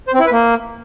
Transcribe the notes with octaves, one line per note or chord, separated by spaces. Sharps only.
C5
C4
E4
B4
A#3